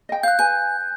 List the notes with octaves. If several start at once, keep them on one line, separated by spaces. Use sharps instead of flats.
D#5 G5
F5 F#6 G6
B4 G#5 G6